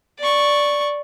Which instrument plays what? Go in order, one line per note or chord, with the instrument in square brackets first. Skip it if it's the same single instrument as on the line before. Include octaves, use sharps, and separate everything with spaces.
[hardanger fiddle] D5 C#6